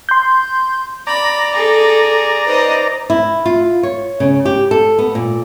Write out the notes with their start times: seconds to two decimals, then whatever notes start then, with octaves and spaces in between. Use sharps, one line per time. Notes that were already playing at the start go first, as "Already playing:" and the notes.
0.09 C6 G6
1.07 D5 A#5 B5
1.55 G#4 A4
2.46 D#4 B4 C5 D#5
3.10 E4
3.45 F4
3.83 C#5
4.20 C#3
4.45 G4
4.71 A4
4.99 B3
5.15 A#2